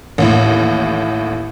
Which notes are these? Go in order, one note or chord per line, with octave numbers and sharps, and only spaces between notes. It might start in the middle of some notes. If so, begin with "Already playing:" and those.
A1 D#2 A2